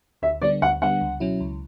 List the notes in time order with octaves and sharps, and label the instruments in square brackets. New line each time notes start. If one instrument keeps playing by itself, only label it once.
[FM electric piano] D2 [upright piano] E5
[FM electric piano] D3 G3 B3 D4 [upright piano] D5
[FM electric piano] D2 [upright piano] F#5
[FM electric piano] D3 G3 B3 D4 [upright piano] F#5
[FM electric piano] C#2
B2 F#3 C#4 E4
C#2